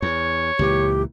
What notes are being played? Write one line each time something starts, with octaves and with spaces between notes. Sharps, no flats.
E2 C#5
C#2 A#2 E3 G4